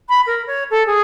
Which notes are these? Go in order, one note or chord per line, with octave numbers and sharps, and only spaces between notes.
B5
A#4
C#5
A4
G#4